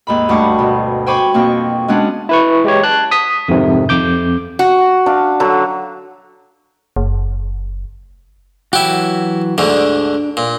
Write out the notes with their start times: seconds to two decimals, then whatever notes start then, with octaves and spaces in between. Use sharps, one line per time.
0.07 D#2 G#2 B5
0.29 D2 G2 F#5 C#6 D6
0.59 B2
1.06 C5 G5 G#5 B5 C#6 D6
1.34 F2 B2 A#3 C4 C#6
1.88 G#3 B3 C#4 D4 F#5
2.29 E4 B4 C#6
2.64 G#3 G4 C#5
2.83 A5 F#6
3.11 D#6 B6
3.48 F2 G#2 C3 D#3
3.89 F2 D6 G6
4.59 F#4
5.06 D4 F5
5.40 D3 F#3
6.96 F#1
8.73 E3 F#3 E4 F#4 G4
9.58 D2 G#2 D3 D4
10.37 A#2